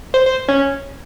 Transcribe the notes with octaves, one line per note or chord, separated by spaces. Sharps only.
C5
C5
C#4